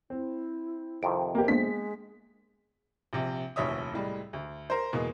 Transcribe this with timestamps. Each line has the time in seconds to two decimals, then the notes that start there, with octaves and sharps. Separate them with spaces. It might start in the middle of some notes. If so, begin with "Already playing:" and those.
0.10 C4 E4
1.03 F2 C3 D#3 D7
1.35 A#3 B3 G4
1.48 G#3 A#3 B3 D4 B6
3.13 A#1 C3
3.56 F1 A#1 D#2 C#5 E5 D#6
3.93 C2 A2 G3 G#3
4.33 D2
4.70 A#4 C5
4.93 E2 B2 G#3 A#3